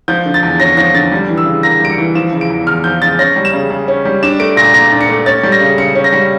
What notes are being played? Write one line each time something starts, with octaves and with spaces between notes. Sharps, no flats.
F3 G6
D3
A6
E2
C#4 A#6
F3 A#6
D3 A6
G3
E3
E6
C#3
A#3 A#6
G3 D7
C#7
E3
F3 E7
C#3
D7
E2
E2 F6
F3 G6
C#3 A6
C#4 A#6
G3
E7
C#3
C#3
C#4
G3
D4 E7
A3 D7
A#2 A#6
A#2 A#6
D4
C#7
A3
C#4 A6
G3
A#6
C#3
C#3 C#7
C#4
A#6
G3